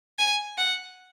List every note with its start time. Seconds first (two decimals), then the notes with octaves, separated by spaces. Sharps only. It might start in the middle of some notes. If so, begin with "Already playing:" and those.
0.19 G#5
0.58 F#5